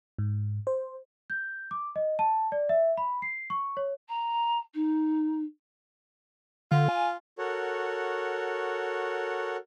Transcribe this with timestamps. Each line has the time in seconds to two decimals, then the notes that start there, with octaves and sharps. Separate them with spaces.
0.18 G#2
0.67 C5
1.30 G6
1.71 D6
1.96 D#5
2.19 A5
2.52 D5
2.69 E5
2.97 B5
3.22 C7
3.50 C#6
3.77 C#5
4.08 A#5
4.74 D#4
6.71 D3 F4
6.88 G#5
7.38 F#4 A4 A#4 C#5 F#5